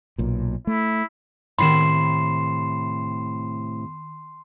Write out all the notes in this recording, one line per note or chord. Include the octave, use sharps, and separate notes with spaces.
B1 A#2
A3 E4
A2 C3 D#3 B5 C6 C7 E7